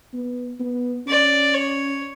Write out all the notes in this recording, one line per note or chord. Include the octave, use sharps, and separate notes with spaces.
B3
B3
C#4 D5
C#5